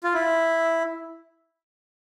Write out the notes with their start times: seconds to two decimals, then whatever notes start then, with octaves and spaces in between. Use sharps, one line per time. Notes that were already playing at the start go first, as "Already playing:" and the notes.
0.04 F4
0.14 E4